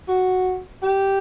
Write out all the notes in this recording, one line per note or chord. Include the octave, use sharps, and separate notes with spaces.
F#4
G4